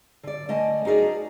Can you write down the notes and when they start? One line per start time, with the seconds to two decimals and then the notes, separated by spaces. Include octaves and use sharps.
0.23 D3 D5
0.49 D3 A3 D#5 G#5 A5
0.85 D#4 F#4 G#4 A#4 D5